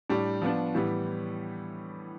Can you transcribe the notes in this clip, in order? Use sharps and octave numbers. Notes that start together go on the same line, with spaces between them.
A2 G3 D4
F3 B3 D4
A2 E3 G3 B3